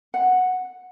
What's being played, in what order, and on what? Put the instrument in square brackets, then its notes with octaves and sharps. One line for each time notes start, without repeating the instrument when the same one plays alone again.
[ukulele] F#5